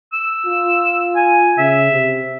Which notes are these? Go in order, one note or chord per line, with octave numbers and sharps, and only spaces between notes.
E6
F4
G#5
C#3 E5
C3